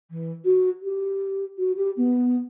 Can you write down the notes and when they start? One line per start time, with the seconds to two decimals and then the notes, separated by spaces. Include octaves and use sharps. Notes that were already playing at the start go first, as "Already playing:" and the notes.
0.11 E3
0.45 F#4
0.83 G4
1.58 F#4
1.76 G4
1.97 B3